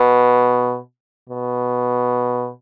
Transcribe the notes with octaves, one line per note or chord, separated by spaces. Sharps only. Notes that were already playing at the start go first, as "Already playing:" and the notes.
Already playing: B2
B2